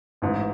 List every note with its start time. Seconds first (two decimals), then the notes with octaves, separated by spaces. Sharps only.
0.22 A1 G#2 E3